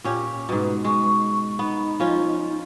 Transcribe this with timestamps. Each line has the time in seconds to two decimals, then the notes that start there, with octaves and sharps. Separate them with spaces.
0.04 A#2 C#4 G4
0.49 G#2 B2 B4
0.85 G#3 C#6
1.59 B3 D#4
2.00 F3 C#4 F4